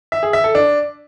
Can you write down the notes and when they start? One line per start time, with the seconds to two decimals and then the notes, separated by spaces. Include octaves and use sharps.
0.12 E5
0.23 G#4
0.33 E5
0.44 A4
0.55 D4